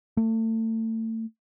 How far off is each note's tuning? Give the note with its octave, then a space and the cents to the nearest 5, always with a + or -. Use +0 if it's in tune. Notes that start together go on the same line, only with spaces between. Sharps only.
A3 +30